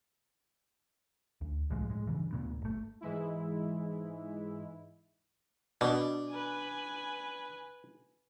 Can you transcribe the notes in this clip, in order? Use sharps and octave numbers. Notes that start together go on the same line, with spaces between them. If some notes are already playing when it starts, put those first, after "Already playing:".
D2
C2 A2 F3 G#3
D1 A2 G#3
G2 C#3 E3
D2 A#2 B3
G1 A3
G#2 E3 G#3 E4
B2 D4
B4 G#5